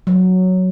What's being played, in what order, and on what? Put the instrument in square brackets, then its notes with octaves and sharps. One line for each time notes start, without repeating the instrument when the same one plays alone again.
[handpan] F#3